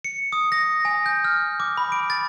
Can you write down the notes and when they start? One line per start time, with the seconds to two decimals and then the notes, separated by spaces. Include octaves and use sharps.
0.04 C#7
0.33 D#6
0.52 A#6
0.85 G#5
1.06 G6
1.25 F6
1.60 D6
1.77 B5
1.92 D7
2.10 A6